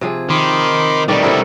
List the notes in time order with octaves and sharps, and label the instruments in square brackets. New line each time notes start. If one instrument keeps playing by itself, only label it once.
[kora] C3 F3 G#4
[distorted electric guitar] D#3 [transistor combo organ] B5 C6 D6
[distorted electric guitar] B2 G3 [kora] D#3 A3 D4 [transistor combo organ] D5
[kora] C3 A4 A#4 [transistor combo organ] E4